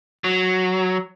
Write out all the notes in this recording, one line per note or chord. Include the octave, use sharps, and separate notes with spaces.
F#3